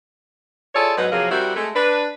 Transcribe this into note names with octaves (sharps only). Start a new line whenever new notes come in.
E4 F4 G#4 A4 C#5 D5
G#2 F#3 B3 D#4 B4
C3 F3 F#3 A#3 G#4 A#4
G3 C4 E4 F#4 G4 A#4
G#3 A3 A4
D4 B4